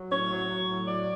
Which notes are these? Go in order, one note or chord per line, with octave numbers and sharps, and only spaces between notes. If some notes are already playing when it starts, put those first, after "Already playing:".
Already playing: F#3
A2 C#5
F#3
F#3
A2
F#3 D5